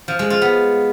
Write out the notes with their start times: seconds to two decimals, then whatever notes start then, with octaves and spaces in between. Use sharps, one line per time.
0.08 F3
0.19 G#3
0.30 F4
0.42 B3